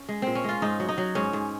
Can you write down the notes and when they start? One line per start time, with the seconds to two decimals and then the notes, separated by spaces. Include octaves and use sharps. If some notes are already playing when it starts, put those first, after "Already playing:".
Already playing: C#4
0.09 G#3
0.22 A#2 C4
0.35 C#4
0.44 G#3 F4
0.62 G#2 D#4
0.80 F#3
0.89 D#4
0.98 F#3
1.15 G#2 C#4
1.33 G#2